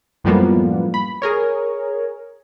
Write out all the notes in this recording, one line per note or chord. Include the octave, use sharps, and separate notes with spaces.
F#2 A2 F3 G3 A#3 B3
B5
G#4 A#4 C#5